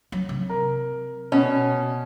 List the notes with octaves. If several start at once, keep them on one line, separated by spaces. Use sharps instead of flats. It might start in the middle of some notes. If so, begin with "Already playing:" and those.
F#3
C3
A#4
B2 C#4